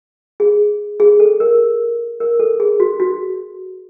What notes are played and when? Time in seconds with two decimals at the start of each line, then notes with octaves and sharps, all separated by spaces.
0.40 G#4
1.00 G#4
1.20 A4
1.40 A#4
2.20 A#4
2.40 A4
2.60 G#4
2.80 F#4
3.00 F#4